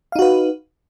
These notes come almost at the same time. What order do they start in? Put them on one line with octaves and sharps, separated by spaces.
F5 D#4 F#4 B4